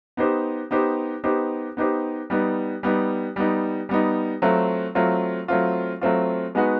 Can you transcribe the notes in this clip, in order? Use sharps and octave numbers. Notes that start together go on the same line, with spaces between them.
B3 D#4 G4 C5
B3 D#4 G4 C5
B3 D#4 G4 C5
B3 D#4 G4 C5
G3 B3 D#4
G3 B3 D#4
G3 B3 D#4
G3 B3 D#4
F#3 A3 C4 F4
F#3 A3 C4 F4
F#3 A3 C4 F4
F#3 A3 C4 F4
G#3 B3 D#4 F#4 B4